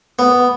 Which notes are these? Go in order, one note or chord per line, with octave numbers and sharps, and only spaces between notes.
B3